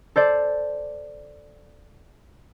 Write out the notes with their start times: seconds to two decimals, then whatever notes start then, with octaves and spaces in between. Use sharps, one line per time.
0.16 A4 C5 D5